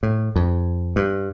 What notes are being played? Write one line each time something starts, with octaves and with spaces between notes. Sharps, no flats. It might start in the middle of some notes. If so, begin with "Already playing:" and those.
A2
F2
G2